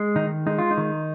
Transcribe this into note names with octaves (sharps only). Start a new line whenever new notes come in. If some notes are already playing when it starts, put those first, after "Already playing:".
Already playing: G#3
D#3 D#4
G#3 D#4
F4
D#4
D#3